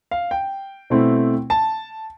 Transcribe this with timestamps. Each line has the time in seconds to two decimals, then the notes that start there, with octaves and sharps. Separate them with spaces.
0.11 F5
0.31 G5
0.90 B2 A3 C4 E4
1.50 A5